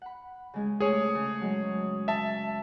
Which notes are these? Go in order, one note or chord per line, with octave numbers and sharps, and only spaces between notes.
F#5 B5
C#3 G#3 G#4
C3 A3 G#4 C#5
C#3
F#3 G#3
E5 A5